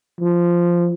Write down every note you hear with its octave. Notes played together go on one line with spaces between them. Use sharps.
F3